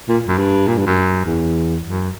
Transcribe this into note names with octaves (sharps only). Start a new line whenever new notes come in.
A#2
F#2
G2
A#2
G2
F#2
E2
F#2